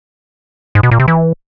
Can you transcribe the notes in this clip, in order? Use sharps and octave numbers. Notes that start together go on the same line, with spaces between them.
G#2
B2
A#2
C3
E3